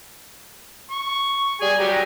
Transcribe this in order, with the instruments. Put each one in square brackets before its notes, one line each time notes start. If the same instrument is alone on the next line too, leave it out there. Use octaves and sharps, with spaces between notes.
[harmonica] C#6
[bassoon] G3 [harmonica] G#4 G#5
[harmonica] F#3 G4 A#5